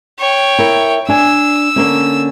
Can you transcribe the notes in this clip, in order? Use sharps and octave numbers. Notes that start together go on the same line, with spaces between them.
C#5 G5
E4 A#4
D4 G#5 E6
D3 A#3 C#4